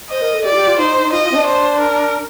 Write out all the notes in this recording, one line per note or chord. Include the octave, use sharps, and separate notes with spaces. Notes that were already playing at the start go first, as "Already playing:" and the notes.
C5 D#5
A#4
A4
G4 D5
F4
G4
F4
D#4 C5
D#4
F4 D#5
F4
C4
D4
C5
A#4